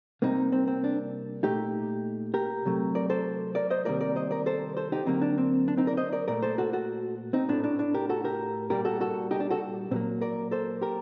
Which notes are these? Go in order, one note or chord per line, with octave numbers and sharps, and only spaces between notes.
C3 G3 A#3 C4 D#4
C4
C4
D4
A#2 A3 D#4 G4
G4 A#4
C3 F#3 A3
A#4 D5
A4 C5
A#4 D5
C5 D#5
C3 D#3 G3 A#3 A#4 D5
A#4 D5
C5 D#5
A#4 D5
A4 C5
A4 C5
D#4 G4
D3 F#3 A#3 C4 D#4
D4
C4
D4
C4 D#4
A#4 D5
C5 D#5
A#4 D5
A#2 A3 A#4 D5
A4 C5
F#4 A4
F#4 A4
C4 D#4
A2 A3 D4
D4
D4
G4 A#4
F#4 A4
G4 A#4
A#2 G3 A#3 G4 A#4
F#4 A4
F#4 A4
D#4 G4
D4
F#4 A4
A#2 F#3 A#3 C4
A#4 D5
A4 C5
G4 A#4